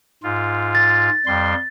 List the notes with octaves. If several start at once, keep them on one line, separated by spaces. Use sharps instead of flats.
G#2 F4
A6
F2 G3 C6